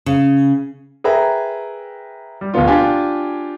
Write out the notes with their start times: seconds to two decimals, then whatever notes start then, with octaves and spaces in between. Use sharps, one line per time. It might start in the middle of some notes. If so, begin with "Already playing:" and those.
0.06 C#3
1.04 G#4 A#4 B4 E5 G5 A#5
2.41 G3
2.54 D1 B2 F3 B3 F4
2.67 D4 F4 G4 G#5